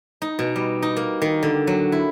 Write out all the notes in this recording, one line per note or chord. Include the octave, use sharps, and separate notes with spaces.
D#4
B2
G3
D#4
A#3
D#3
D3
F#3
E4